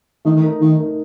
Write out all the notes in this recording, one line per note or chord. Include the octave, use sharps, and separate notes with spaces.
D#3 A3
D#3
D#4 A#4
D#3 A3
D#4 A#4